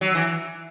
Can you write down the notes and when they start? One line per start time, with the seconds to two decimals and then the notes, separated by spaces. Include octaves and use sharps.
0.01 F#3
0.15 E3